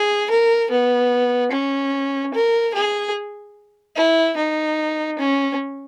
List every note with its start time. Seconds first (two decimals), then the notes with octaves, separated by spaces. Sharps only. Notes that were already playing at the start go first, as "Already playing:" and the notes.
Already playing: G#4
0.30 A#4
0.71 B3
1.52 C#4
2.34 A#4
2.74 G#4
3.96 E4
4.37 D#4
5.19 C#4